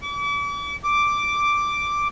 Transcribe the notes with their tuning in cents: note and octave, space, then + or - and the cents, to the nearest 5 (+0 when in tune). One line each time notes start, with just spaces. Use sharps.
D6 -40
D6 +0